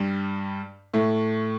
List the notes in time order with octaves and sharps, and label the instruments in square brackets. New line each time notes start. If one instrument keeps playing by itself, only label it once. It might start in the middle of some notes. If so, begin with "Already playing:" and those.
Already playing: [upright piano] G2 G3
A2 A3